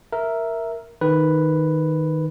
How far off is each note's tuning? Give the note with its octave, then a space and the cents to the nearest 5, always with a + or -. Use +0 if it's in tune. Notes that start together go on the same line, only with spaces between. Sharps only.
A#4 +0 E5 +0
D#3 +0 B4 +0